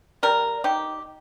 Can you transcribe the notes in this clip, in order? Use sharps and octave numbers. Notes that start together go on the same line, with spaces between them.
G3 A#4
D#4 G4